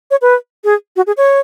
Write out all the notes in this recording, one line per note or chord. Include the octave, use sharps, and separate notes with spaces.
C#5
B4
G#4
F#4
G#4
C#5